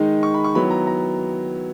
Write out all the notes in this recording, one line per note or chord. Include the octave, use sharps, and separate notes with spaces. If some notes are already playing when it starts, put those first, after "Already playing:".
Already playing: D#3 G#3 D#4
C#6
B5
C#6
D#3 F#3 B3 E4 B5
A#5
A#5